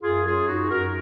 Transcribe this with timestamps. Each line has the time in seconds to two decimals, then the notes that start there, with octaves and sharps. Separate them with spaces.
0.02 F#2 F4 G#4
0.24 F#3 F4 G#4
0.47 F#2 D#4 F#4
0.69 F#2 F#4 A#4